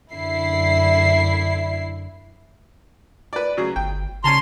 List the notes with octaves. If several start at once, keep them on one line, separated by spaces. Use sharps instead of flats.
F#2 D3 E4 C7
B4 D5
C#3 F#3 G#4
G1 G5
C#3 C#4 A5 A#5 C6